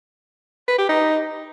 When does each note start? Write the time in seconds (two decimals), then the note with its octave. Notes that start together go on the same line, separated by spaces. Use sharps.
0.68 B4
0.79 G4
0.89 D#4